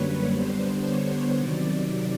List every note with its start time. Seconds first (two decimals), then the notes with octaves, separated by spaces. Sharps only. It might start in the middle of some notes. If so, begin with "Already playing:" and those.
Already playing: F#2 D3 G3 A#3 B4 C#5
0.31 D3 G3 B3 D4 C5
0.84 C#5
1.37 C3 D#3 F#3 D5